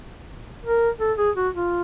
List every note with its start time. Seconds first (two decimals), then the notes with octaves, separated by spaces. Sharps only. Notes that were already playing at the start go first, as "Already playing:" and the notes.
0.65 A#4
1.00 A4
1.18 G#4
1.36 F#4
1.54 F4